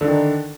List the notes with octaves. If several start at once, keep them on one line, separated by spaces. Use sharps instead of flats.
D3 D#3 D4